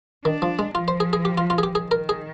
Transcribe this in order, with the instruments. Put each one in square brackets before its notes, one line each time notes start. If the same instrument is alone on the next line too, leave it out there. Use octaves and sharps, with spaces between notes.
[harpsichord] D#3 [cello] D4
[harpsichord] F3
G#3
[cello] F3 [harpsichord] F4
[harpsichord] C5
G#4
G#4
G4
F4
F4
G#4
G4
[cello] D#3 [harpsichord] G#4
[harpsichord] A#4
G#4